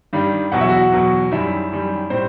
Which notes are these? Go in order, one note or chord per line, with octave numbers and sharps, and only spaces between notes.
G2 D#3 G3
E2 B2 F#3 F#5
E5
F#4 F#5
E2 B2 F#3
F#2 D#3 G3 E4 E5
F#2 D#3 G3
A2 G3 C4 C5